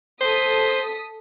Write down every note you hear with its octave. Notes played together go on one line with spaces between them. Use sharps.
A4 C5 D#6 B6